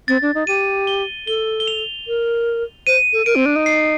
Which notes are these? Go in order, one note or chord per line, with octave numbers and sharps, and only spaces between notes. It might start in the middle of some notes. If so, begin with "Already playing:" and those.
C4 A6
D4
D#4
G4 D#7
G7
A4 G7
G7
F7
A#4
C5 D#7
A4
A#4 D7
C4
D4
D#4
C7